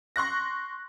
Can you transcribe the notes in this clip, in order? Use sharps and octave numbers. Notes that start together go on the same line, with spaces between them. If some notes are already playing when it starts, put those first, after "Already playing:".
C6 C#6 F#6 A#6